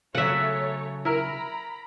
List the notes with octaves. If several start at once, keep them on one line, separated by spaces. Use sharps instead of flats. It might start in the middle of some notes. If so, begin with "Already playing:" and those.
C#3 F#3 A3 C#5 E5 F#5
E4 A#4 A#5 B5